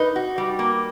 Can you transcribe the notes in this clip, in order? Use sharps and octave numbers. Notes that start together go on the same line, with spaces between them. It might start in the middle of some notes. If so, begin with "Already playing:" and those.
Already playing: D#4 B4
F#4
G3
A#3